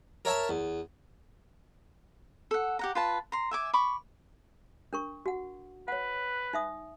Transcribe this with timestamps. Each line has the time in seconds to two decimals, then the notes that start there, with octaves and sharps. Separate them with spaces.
0.25 A#4 C#5 E5 A5
0.49 E2
2.51 A4 F#5
2.79 G4 F#5 A#5
2.95 F4 B4 A5
3.32 A#5 C6
3.51 E5 G#5 D6
3.73 B5 C#6 D6
4.93 D4 A#4 C#6
5.26 F#4 F#5
5.88 B4 C#5 F#5
6.53 D#4 E5 D#6